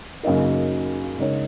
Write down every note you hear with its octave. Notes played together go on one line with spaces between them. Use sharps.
F#2 C#3 A#3 D#4 A#4
C#3 G#3 D#4 A#4 C#5